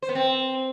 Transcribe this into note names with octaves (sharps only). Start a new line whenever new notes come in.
C5
B3
C4